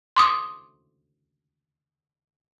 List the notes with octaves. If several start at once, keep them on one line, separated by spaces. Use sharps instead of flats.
C6 D6 D#6